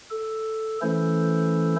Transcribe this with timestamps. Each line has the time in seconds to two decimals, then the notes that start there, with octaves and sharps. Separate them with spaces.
0.11 A4
0.82 E3 A3 C#4 E4 A4 C5